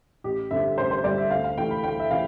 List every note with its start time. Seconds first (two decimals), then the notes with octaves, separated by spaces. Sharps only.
0.24 A1 G4
0.51 G2 D3 G3 C4 E5
0.78 A1 C5
0.91 C5
1.04 G2 D3 G3 C4 D5
1.18 E5
1.31 D2 F5
1.44 F5
1.57 C3 E3 A3 G5
1.71 B5
1.84 D2 G5
2.00 E5
2.10 C3 E3 A3 F5